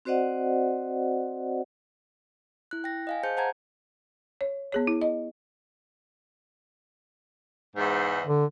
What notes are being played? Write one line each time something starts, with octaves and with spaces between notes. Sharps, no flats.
C4 F#4 C5 D5 D#5 F#5
E4 F#6
G5 A#6
D#5 F5 G#5
G#4 C5 A5 G6 C#7
C5 F#5 A5 A#5 G#6
C#5
B3 G#4 C#5
E4
D#5
E2 G#2
D3